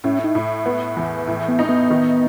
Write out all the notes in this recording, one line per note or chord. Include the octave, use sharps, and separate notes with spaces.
A2 C#4
D#4
A2
B3
E2
A2
B3
D#4
B3
D#3